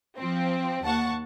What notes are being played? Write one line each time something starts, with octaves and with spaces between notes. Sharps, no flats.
F3 C4
D#2 F#5 A5 C#6